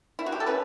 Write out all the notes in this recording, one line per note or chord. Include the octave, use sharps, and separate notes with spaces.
E4
F#4
G4
A4
A3 C#4 B4